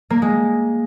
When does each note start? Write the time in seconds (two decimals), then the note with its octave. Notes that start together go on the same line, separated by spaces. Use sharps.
0.10 A#3
0.22 G#3